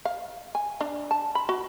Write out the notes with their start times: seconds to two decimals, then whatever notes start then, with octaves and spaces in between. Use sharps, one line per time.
0.05 F5
0.55 G#5
0.81 D4
1.11 A5
1.35 B5
1.49 F#4